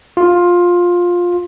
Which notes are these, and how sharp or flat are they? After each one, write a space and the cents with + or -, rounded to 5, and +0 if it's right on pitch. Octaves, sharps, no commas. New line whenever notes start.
F4 +15